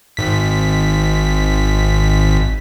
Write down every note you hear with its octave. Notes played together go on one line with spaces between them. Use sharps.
G#1 B6